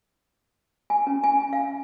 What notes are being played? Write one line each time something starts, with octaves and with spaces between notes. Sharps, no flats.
G#5
C#4
G#5
F5